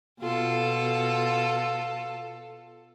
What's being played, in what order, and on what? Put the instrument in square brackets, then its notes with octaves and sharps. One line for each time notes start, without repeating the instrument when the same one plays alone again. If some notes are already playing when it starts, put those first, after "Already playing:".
[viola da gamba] B2 F4 A4